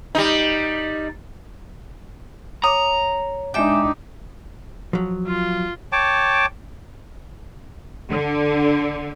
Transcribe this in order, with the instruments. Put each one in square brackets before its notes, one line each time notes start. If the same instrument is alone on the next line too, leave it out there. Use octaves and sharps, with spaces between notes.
[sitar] G3 D#4
[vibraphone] C#5 [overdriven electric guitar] A#5 [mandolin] D#6
[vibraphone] G#3 E5 D6 [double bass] D4 D#4 [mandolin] G4
[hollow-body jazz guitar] F3 F#3
[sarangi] F4
[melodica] C#5 G5 A5 D6
[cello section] D3